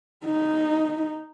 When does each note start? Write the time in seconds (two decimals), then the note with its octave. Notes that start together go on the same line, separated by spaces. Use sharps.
0.25 D#4